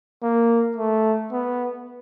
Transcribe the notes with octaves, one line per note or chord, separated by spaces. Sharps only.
A#3
A3
B3